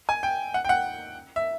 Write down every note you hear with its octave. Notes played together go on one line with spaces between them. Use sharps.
G#5
G5
F#5
G5
F#5
E5